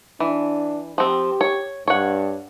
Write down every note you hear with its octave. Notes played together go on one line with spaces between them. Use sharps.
E3 D4
F3 C4 G4
C#5
G2 C#5 F#5